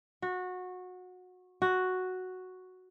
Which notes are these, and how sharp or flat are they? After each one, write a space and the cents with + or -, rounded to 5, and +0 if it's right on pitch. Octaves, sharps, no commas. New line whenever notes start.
F#4 -20
F#4 +0